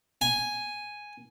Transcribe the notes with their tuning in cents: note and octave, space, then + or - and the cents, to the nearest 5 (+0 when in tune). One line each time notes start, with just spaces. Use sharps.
G#5 +0